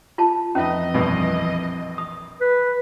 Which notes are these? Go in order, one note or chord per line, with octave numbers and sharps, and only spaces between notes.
F4 A5
F2 E3 C#4 D#4 B4 D#5 E5
A#1 G2 B2
D#6
B4